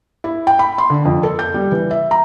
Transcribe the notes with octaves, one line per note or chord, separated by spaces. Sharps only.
E4
G5
B5
C6
D3
F2
A4
G6
G3
E3
E5
A#5